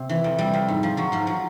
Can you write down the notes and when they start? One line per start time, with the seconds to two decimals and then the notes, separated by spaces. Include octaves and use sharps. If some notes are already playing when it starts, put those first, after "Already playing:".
Already playing: C3
0.09 E3
0.24 F2
0.38 C3 G3
0.53 F2
0.68 G#2
0.83 F3
0.97 F3 F#3
1.12 G#2 F3
1.27 F#3